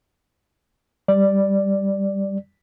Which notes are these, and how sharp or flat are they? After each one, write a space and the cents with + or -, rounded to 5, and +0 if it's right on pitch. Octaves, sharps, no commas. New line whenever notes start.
G3 +5 D5 +0